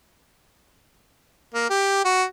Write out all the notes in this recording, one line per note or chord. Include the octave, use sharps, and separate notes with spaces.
A#3
G4
F#4